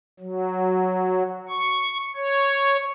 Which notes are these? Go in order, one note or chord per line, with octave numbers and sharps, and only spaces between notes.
F#3
C#6
C#5